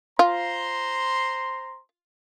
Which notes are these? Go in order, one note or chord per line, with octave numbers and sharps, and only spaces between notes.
F4 C5 A#5 C6